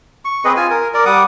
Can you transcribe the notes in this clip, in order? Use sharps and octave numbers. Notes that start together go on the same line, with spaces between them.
C#6
C4 G#4 B4 D#5
F4 G#5
A#4
A#4 D5
G3 F#5 D6 D#6